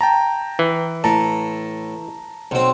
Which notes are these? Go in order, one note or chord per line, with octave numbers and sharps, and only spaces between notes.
G5 A5 A#5
E3
A2 A5 A#5
B1 C4